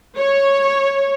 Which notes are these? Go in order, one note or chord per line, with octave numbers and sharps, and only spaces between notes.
C#5